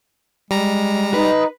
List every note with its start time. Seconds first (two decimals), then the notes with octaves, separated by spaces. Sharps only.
0.51 G3 G#3 A#5
1.14 D#4 B4